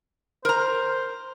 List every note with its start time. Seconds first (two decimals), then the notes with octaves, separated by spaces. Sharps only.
0.45 A#4 C5 A#5